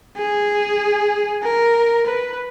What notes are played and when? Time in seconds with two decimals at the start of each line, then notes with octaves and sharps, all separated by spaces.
0.17 G#4
1.43 A#4
2.06 B4